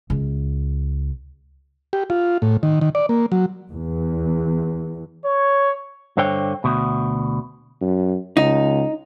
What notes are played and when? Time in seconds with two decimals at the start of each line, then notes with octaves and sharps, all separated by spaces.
0.10 C#2
1.93 G4
2.10 F4
2.42 A2
2.63 D#3
2.81 D#3
2.95 D5
3.09 A#3
3.32 F#3
3.71 E2
5.25 C#5
6.17 G2 D3 C5 C#5 G5
6.64 D2 B2
7.81 F#2
8.37 C#2 D#4